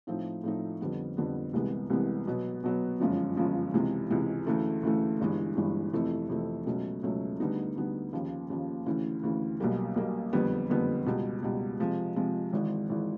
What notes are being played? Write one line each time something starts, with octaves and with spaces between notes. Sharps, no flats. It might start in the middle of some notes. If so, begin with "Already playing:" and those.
A2 F3 A3 C4 D#4
A2 F3 A3 C4 D#4
F2 D3 G3 B3
F2 D3 G3 B3
C2 C3 E3 G#3 B3
C2 C3 E3 G#3 B3
B2 F#3 B3
B2 F#3 B3
G1 F#2 C#3 F3 G#3
G1 F#2 C#3 F3 G#3
C#2 C3 E3 G#3
C#2 C3 E3 G#3
D2 C#3 E3 A3
D2 C#3 E3 A3
G1 G2 E3 G#3
G1 G2 E3 G#3
F2 C3 E3 A3
F2 C3 E3 A3
C#2 B2 F#3 A3 C#4
C#2 B2 F#3 A3 C#4
D2 D3 G3 B3 D#4
D2 D3 G3 B3 D#4
D#2 C#3 F3
D#2 C#3 F3
D2 C#3 E3
D2 C#3 E3
B1 B2 G3 A#3
B1 B2 G3 A#3
F#1 F2 D3 G3 B3
F#1 F2 D3 G3 B3
C#2 B2 G3
C#2 B2 G3
C3 F3 G#3
C3 F3 G#3
G#1 G#2 E3
G#1 G#2 E3